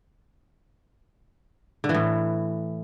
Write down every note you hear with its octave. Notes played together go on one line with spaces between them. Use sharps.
D3
E3
A2